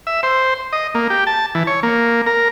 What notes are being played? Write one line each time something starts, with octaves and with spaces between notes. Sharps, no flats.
E5
C5
D#5
A#3
G4
A5
E3
C#5
A#3
A#4